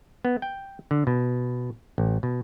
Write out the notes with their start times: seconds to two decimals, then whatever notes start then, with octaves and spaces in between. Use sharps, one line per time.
0.25 B3
0.42 G5
0.91 D3
1.07 B2
1.98 A1
2.23 B2